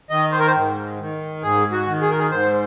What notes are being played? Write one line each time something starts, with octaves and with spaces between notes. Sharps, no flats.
D#3 D#5
C5
A#4
C5
G#2
D#3
G#2 G#4
F#4
D#3
G#4
A#4
G#4
G#2 C5